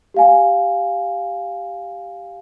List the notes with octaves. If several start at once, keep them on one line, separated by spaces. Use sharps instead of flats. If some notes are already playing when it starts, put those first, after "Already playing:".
G4 F5 G#5